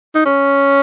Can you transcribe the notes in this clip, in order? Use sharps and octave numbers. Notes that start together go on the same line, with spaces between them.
D#4
C#4